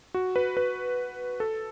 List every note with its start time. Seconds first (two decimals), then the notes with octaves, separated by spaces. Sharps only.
0.14 F#4
0.36 B4
0.57 B4
1.40 A4